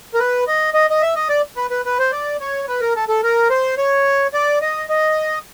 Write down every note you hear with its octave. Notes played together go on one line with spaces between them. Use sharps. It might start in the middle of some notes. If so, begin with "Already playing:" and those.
A#4
B4
D#5
D#5
D#5
E5
D#5
D5
B4
B4
B4
C5
D5
C#5
B4
A#4
A4
A4
A#4
C5
C#5
D5
D#5
D#5